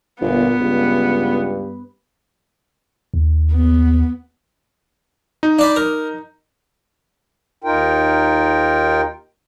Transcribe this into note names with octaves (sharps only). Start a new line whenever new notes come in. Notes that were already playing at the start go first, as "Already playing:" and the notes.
G1 A#2 B3
C#2 G2
D#2
B3
D#4
D4 D5 B5
A#4
D#2 D#4 F4 A#4 G5